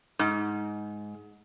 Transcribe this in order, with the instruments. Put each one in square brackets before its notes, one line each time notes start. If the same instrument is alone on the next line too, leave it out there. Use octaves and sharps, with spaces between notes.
[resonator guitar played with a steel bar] G#2